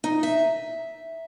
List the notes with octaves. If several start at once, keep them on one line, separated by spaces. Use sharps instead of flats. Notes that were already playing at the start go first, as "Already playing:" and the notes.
D#4
E5